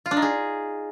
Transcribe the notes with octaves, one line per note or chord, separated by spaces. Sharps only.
F4
D4
D#4
G#4